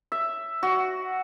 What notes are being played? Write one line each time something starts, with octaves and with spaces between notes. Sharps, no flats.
E5
F#4